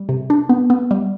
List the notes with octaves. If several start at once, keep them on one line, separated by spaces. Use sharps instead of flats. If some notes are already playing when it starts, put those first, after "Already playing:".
Already playing: G3
C3
D4
B3
B3
G3